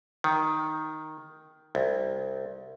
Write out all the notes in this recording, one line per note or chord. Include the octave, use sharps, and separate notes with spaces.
D#3
C2